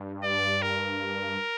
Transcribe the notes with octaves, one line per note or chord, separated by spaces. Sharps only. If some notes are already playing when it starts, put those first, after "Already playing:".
Already playing: G2
D5
A#4